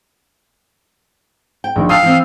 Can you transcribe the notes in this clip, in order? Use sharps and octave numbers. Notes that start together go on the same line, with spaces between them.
G5
A#1 D#3
F5 G5 A5 D#6 E6 A6
E3 C4